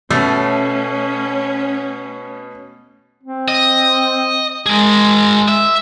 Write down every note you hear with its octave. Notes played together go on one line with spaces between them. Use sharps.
B2 A3 C#4
C4
D#5
G#3 G#4 A#4
E5